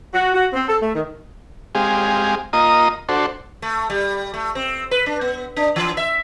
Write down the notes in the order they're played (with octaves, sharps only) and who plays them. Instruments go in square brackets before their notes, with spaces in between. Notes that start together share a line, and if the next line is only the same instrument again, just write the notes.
[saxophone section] F#4
F#4
C4
A4
A3
D#3
[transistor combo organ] G#3 C4 G4 G#4 F5
A#3 F4 D#5 A#5 D#6
D4 F#4 A4 C5
[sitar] A3
G3
A3
C4
B4
D4
B3
D4
E3
E5